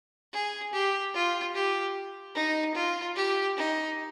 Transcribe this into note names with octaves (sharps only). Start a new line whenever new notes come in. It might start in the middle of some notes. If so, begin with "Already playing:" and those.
G#4
G4
F4
G4
D#4
F4
G4
D#4